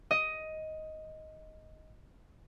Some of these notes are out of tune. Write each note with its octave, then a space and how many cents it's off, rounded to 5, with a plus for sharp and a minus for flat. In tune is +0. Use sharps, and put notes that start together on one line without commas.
D#5 +10